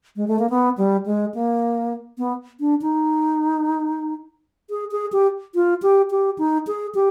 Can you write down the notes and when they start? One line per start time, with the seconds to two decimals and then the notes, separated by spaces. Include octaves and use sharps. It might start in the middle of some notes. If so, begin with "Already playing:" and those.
0.16 G#3
0.28 A3
0.39 A#3
0.50 B3
0.78 G3
1.06 G#3
1.34 A#3
2.18 B3
2.60 D4
2.82 D#4
4.70 G#4
4.92 G#4
5.13 G4
5.55 F4
5.82 G4
6.11 G4
6.39 D#4
6.67 G#4
6.95 G4